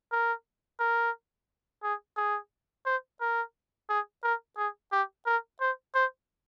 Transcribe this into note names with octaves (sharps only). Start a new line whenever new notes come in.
A#4
A#4
G#4
G#4
C5
A#4
G#4
A#4
G#4
G4
A#4
C5
C5